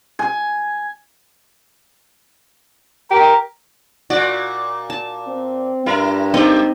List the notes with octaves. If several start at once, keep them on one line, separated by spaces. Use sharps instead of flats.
G#5
G4 A#4
A#2 F#4 D5
A5
C4
G2 E4 A#4
G#3 C4 D#4 G4 D#5